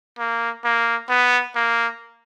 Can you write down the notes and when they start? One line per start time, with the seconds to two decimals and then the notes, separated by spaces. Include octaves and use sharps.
0.18 A#3
0.64 A#3
1.09 B3
1.55 A#3